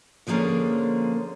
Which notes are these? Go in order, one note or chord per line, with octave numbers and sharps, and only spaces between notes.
D3 F3 G#3 A#3 C#4 D4